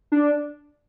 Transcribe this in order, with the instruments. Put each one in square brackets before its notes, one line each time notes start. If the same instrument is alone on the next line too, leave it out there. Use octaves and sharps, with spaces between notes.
[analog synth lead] D4